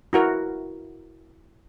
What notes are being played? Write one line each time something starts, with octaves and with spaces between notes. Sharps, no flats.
E4 F#4 A#4